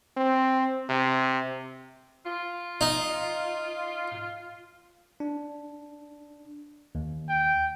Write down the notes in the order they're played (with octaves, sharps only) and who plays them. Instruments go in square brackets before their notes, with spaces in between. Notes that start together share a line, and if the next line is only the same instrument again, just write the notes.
[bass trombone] C4
C3
[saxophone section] F4
[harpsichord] D#4
[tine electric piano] D4
D#2
[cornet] G5